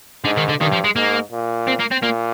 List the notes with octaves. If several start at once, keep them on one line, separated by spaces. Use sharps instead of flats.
G#2 D3
D#3
D3
G2 D#3
F3
G#3
G#2 A#3
A#2
C4
A#3
C4
A#2 A#3